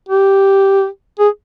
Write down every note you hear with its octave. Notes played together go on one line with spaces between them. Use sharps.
G4
G#4